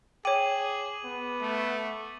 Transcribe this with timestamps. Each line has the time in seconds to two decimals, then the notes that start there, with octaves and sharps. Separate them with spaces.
0.25 G#4 C#5 G5 D6 D#7 F#7
1.06 B3
1.41 A3